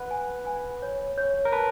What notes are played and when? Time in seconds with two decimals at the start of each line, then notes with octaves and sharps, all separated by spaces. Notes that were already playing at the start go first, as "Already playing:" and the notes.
Already playing: B4 F#5
0.11 G#5
0.47 G#5
0.82 C#5
1.18 C#5
1.45 A#4
1.52 B4 A5